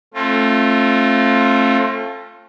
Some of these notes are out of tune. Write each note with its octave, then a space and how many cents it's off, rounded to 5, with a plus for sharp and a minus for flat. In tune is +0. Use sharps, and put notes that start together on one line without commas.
A3 +0 C4 +40 F4 +0